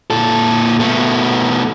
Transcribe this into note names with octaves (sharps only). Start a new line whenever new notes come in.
A#2 A4
B2 A3